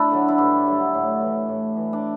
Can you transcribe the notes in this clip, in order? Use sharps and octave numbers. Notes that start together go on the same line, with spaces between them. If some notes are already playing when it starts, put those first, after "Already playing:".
Already playing: A3 D4 E4
D3 F#3
E4
G2 D4
D3 F#3
A2
E3
A2
E3
D4